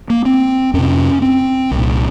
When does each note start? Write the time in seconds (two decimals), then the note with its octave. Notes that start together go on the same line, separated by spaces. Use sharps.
0.10 A#3
0.25 C4
0.74 F2 C3 C#4
1.22 C4
1.71 C2 A#2